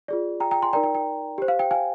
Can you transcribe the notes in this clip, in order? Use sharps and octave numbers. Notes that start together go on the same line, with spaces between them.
F4 G#4 D5
G5 A#5
G5 A#5
G#5 C6
D#4 A#4 D5 G5 A#5
G5
G5
G4 C5
F5
G5
F5 G#5